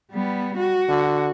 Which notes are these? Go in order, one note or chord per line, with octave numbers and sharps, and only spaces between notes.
G3 B3
F#4
D3